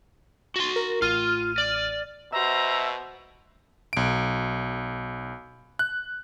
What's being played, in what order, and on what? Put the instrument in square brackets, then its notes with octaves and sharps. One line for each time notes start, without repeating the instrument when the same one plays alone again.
[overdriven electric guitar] F#4 C6
[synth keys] A#4
[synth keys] A1 F6 D#7 [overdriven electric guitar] F4
[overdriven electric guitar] D5
[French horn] B2 [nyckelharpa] F#4 C5 [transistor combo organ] E5 [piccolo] A#5
[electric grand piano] B1 D7
F#6